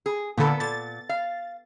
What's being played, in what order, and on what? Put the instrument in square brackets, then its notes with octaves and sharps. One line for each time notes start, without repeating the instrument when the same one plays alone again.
[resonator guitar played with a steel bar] G#4
[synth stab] A#2 D3 [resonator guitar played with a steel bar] B3 A4
[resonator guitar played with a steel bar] A#2 [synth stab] A6
[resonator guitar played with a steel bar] F5